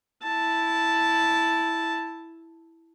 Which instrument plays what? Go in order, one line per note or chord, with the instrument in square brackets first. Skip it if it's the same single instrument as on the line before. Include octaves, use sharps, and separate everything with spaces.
[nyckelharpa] E4 A5